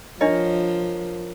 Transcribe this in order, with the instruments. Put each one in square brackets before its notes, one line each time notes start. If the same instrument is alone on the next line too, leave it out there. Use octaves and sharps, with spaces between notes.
[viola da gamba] F3 [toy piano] D4 D#5 [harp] A#4 C#5